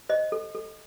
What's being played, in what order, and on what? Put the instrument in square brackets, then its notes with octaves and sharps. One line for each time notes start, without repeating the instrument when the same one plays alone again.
[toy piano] C5 D#5
A4
A4